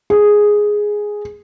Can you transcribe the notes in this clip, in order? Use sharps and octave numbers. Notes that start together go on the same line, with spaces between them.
G#4